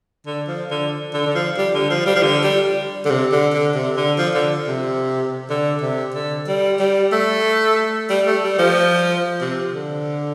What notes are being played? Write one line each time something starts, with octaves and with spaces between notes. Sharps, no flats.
D3
F3
D3
D3
D3
F3
G3
D3
F3
G3
F3
D3
G3
D3
C3
D3
D3
C3
D3
F3
D3
C3
D3
C3
D3
G3
G3
A3
G3
A3
G3
F3
C3
D3